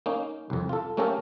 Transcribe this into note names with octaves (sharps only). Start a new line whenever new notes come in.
A#3 C#4 D#4
C2 F2
F4 A4
A3 A#3 C#4 G4 A4 A#4